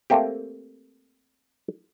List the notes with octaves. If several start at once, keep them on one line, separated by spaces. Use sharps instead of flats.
A3 A#3 C4 G4